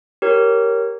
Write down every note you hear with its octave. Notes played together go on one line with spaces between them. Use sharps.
G4 A#4 C#5